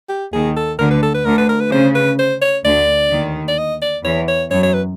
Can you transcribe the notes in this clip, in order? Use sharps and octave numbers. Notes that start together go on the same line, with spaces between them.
G4
D#2 D#3 G#4
A4
D2 D3 A#4
B4
A4
B4
D2 D3 A#4
B4
A#4
B4
C#3 C5
B4
C5
C#5
D2 D3 D5
D#2 D#3
D5
D#5
D5
E2 E3 C#5
C#5
F#2 F#3 C#5
C#5
B4